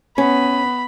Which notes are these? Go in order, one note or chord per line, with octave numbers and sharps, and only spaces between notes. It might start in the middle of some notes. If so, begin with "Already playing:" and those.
B3 C#4 B5